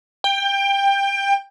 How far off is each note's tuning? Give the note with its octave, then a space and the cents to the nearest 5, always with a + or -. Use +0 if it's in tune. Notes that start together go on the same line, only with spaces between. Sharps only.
G5 +20